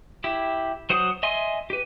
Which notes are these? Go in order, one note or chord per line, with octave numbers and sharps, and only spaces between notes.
E4 G4
F#3 C5 F#5 D#6
D#5 E5 G#5 C6
G4 B4